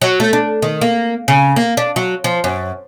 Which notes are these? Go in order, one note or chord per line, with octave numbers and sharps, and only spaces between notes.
F#3
A3
D4
D#3
A#3
C#3
A#3
D4
F#3
F3
F#2